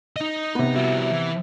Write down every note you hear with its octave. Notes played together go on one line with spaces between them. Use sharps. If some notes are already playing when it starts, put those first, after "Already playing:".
D#4 D#5
C3 B3
G3 E4 F#4
E3